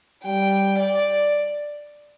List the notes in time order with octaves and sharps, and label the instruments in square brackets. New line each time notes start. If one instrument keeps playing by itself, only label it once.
[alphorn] G3 [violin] G5
[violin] D5